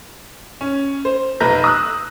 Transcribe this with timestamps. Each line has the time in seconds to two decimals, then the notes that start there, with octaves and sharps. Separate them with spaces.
0.61 C#4
1.05 C5
1.40 F1 B1 B4 A#5 G6 A#6
1.64 D#6 E6 F#6